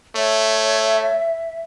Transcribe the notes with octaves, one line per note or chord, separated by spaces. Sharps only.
A3 C#5 E5